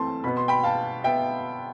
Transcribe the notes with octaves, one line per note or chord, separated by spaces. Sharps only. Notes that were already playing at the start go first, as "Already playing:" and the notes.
Already playing: E3 A3 C4 A5 C6
B2 B3 B5
C6
G5 B5
F5 A5
B2 B3 E5 G5